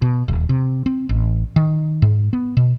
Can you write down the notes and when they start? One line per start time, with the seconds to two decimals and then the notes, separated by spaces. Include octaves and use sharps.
0.02 B2
0.28 D#1
0.49 C3
0.86 C4
1.09 A1
1.56 D#3
2.02 G#2
2.33 B3
2.57 B2